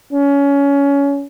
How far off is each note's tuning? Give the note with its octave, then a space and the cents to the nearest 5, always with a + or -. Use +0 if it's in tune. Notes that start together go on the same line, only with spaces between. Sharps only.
C#4 +20